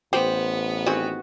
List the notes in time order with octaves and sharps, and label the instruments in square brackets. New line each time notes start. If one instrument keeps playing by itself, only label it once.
[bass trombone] A1 [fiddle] B3 [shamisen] G4 [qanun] C5
[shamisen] D#3 C4 G#4 [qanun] F#4